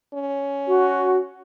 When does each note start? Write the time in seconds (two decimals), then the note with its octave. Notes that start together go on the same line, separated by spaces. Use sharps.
0.14 C#4
0.67 F#4